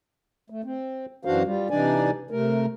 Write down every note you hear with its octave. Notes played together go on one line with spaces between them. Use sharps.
A3
C4
F#2 E3 D4 F#4 C5 F5
G3 F4
C3 E3 D4 D#4 D5 G#5
C3 A3 A#4